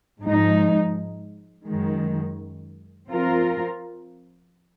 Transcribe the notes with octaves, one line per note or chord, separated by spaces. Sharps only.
G#2 F3 G#3 D#4
F#2 D#3 G#3
F3 C4 F4 A#4